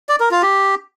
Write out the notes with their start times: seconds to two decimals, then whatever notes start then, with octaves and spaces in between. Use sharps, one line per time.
0.09 D5
0.20 A#4
0.31 F4
0.42 G4